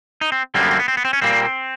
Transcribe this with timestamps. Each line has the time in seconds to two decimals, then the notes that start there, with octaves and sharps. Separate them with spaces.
0.21 D#4
0.32 C4
0.54 F#2 D3 G3 A#3 C4
0.63 B3
0.71 C4
0.80 B3
0.88 C4
0.97 B3
1.05 C4
1.13 C#4
1.22 A#2 G3 A#3 C4